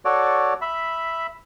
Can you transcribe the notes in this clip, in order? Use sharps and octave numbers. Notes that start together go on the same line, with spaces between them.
F#4 A4 C#5 D5
E5 B5